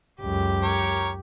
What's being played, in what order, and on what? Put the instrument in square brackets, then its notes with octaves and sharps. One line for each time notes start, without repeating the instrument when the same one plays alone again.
[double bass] C#2 F#2 [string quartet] G4
[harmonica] A#4 C#5